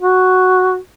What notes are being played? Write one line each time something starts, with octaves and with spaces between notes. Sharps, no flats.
F#4